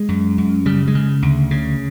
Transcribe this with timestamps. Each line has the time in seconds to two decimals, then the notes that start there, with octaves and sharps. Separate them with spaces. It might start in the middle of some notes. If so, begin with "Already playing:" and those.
Already playing: G#3
0.09 F#2
0.38 F#2
0.66 C#3 G3
0.87 G#3
0.95 C#3
1.22 D2
1.51 C#3